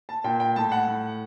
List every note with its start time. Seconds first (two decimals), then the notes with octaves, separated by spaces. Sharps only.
0.09 A5
0.24 A#2 G5
0.40 G5
0.56 A2 A5
0.72 F#5
0.87 A2